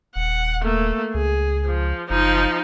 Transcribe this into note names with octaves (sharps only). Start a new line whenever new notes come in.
D#1 F#5
A3 A#3
C#2 G#4
F3
F#1 F3 D#4